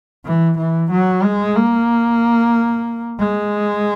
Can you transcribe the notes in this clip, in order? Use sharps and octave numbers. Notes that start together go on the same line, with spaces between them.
E3
E3
F#3
G#3
A#3
G#3